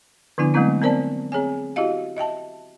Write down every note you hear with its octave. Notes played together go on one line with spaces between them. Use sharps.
D3 F3 B3 D4 E4 G#5
F#3 G#3 A3 B3 C4 E4
B3 C4 A#4 C5 D5 A5
C4 G#4 C#5 G#5
E4 F#4 G4 D#5 F5
D#5 E5 G5 A5